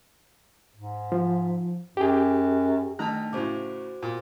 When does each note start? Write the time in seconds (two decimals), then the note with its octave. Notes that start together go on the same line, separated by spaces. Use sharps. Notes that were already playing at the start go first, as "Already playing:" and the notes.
0.75 G#2
1.12 F3
1.97 F#2 G4 G#4
2.99 D#3 A3 D4 A5 A#5 F#6
3.33 A2 C#3 F#4 C5 D6
4.03 A#2